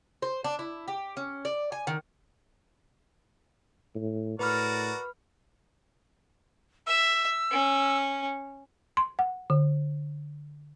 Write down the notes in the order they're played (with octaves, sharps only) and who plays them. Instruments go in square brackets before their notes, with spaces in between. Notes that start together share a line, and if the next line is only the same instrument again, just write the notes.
[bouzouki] C5
D4
E4
G4
C#4
D5
G#5
D#3
[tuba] A2
[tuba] A2 [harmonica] F#4 A#4 D5 [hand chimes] B4 B5 F6
[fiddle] E5 [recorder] E6
[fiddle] C#4
[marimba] C6
F#5
D3